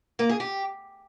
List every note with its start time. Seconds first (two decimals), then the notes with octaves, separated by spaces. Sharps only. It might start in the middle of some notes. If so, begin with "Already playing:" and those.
0.19 A#3
0.29 G#4
0.40 G4